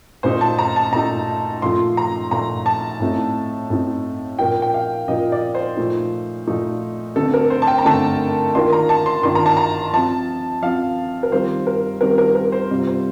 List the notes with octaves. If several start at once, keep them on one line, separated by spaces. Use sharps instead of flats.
A#2 A3 D#4 C5
A5
A#5
A5
A#2 A3 D#4 A#5
A#2 F3 A3 C6
A#5
A#2 F3 A3 A#5
A5
A2 A3 C4 D#4
A2 A3 C4 D#4
A#2 F3 A#3 D#4 G5
G5
F5
A#2 F3 A#3 D#4 D#5
D5
C5
A#2 F3 A3 D#4
A#2 F3 A3 D#4
D3 A3 C4 A4
A#4
C5
A5
G5
A#5
D3 A3 C4 A5
D#3 A#3 D4 F4 C6
A#5
A5
C6
D#3 A#3 D4 F4 C6
A#5
A5
A#5
F3 C4 F4 A5
F3 C4 F4 F5
A#4
D#3 G3 C4 F4 C5
A#4
D#3 G3 C4 F4 A#4
A#4
A#4
C5
C3 G3 C4 F4
C5